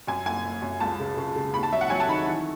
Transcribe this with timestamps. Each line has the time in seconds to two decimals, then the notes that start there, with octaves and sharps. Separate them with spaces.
0.07 F#2 G#5
0.25 F#1 G#5
0.45 F#1
0.62 F#2
0.80 C#2 A5
1.00 C#3
1.17 C#3
1.36 C#3
1.54 D#2 B5
1.63 A5
1.72 F#3 E5
1.81 F#5
1.90 F#3 G#5
2.00 A5
2.09 D#3 B5
2.27 E3